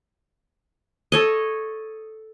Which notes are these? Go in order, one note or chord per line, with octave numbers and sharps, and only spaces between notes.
A4 C#5 D#5